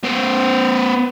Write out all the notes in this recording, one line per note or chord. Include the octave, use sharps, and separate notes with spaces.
B3 C5